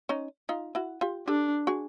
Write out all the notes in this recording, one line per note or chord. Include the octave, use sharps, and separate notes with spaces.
C#4 D#4
D#4 F4
E4 F#4
F4 G4
D4 G4 A4
F#4 G#4